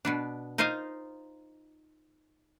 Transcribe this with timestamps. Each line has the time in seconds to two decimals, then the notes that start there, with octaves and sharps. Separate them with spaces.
0.05 B2 B3 D4
0.58 D#4 F4 A#4 C5 D#5 F5